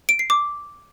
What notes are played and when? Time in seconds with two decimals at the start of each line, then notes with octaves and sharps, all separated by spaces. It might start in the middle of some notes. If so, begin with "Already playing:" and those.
0.09 D7
0.19 C7
0.30 D6